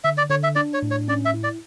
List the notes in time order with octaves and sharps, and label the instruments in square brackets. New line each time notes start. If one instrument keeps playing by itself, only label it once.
[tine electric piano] D3 [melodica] E5
[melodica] D5
[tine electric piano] D3 [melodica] C#5
[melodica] E5
[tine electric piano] D4 [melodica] D5
[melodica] C#5
[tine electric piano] A2
[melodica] C#5
[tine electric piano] C#4 [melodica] D5
[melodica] E5
[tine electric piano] E4
[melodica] D5